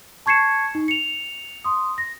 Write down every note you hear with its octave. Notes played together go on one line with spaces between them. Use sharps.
A5 C#6 G#6 C7 C#7 E7
D#4
C#7 F7
C6 D#6
A#6